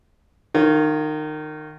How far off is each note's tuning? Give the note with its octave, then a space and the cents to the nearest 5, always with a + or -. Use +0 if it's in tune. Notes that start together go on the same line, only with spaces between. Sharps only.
D#3 -25 F4 +0 C#5 +0